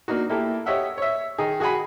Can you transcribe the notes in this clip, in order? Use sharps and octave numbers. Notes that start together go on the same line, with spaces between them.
A#3 D4 D#4 F#4
A#3 E4 G4 A4
G4 C#5 D#5 E5 F#5
C#5 E5
D#3 D#4 G#4
F#4 G#4 F#5 G#5 B5